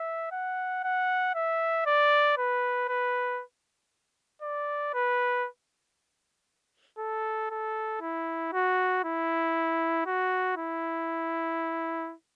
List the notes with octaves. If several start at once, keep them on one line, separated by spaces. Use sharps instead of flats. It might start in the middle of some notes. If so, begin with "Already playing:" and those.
Already playing: E5
F#5
F#5
E5
D5
B4
B4
D5
B4
A4
A4
E4
F#4
E4
F#4
E4